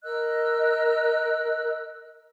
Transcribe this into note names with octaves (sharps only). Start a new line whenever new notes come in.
A#4 D#5 E6 F#6